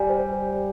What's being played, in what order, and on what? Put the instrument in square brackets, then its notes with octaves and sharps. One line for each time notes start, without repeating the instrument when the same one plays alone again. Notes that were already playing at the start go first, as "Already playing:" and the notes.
Already playing: [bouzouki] G3 [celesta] G#5
[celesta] C5